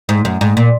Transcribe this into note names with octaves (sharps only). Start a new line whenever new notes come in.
G#2
F#2
G#2
A#2